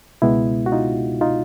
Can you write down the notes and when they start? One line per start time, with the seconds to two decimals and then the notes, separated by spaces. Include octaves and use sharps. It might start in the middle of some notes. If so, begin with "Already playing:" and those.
0.22 C#2 B2 G#3 B3 E4
0.66 F#4
0.72 D#4 F4
1.21 D#4 F4